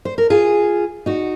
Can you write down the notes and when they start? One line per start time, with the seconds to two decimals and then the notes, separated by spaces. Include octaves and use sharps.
0.05 C5
0.18 A#4
0.30 F4 G#4
1.06 D#4 F#4